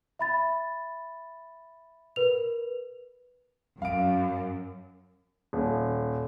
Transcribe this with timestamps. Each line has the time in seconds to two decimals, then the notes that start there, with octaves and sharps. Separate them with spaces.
0.19 E5 B5 A6
2.16 A#4 B4 F7
3.82 F#2 F5 D7
5.53 D#1